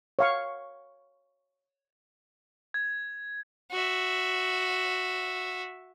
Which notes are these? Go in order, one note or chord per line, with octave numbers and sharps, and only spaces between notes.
C#5 F5 C#6
G#6
F#4 E5